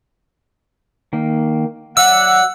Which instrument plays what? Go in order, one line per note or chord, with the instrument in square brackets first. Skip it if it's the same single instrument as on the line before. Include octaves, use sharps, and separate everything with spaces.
[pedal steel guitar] D#3 A#3
[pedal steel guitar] F#3 D5 E5 [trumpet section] F#5 [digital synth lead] E6